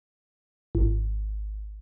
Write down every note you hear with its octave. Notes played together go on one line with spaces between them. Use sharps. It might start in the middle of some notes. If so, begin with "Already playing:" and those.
G#1